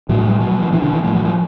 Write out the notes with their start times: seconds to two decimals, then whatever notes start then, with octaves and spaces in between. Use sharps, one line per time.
0.09 A2 F#3
0.26 G3
0.40 B2 F#3
0.51 F#3
0.62 F3
0.72 B2 E3
0.82 D3
0.93 E3
1.03 A2 F3
1.14 F#3
1.25 F3